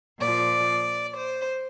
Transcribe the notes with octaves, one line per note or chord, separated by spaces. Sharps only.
A#2 F3 D5
C5